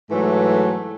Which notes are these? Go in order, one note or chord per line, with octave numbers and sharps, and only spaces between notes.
G#2 E3 F#3 A3